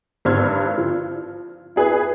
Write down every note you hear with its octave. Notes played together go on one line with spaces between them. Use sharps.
G#1 G2 C5 E6 F6 G#6
F3
E4 G#4 B4 G#6